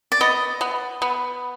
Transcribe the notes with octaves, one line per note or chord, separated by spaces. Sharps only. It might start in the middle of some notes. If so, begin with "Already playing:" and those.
D5
B3 D#5
B3
B3